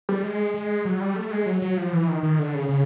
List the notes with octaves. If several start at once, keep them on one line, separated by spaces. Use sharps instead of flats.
G3
G#3
G#3
F#3
G3
A3
G#3
F#3
F#3
F3
E3
D#3
D#3
D3
C#3
C#3